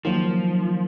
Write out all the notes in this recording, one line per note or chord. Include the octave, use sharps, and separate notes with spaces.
D#3 F3 F#3 A#3